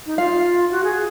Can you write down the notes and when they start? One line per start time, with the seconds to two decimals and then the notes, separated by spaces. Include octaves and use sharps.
0.06 D#4
0.17 F4 F5
0.71 F#4
0.84 G#4